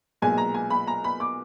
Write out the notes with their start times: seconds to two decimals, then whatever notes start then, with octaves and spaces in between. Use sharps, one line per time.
0.22 B1 A#2 G#3 G#5
0.38 A#5
0.54 G#5
0.70 B5
0.87 A#5
1.04 B5
1.20 D6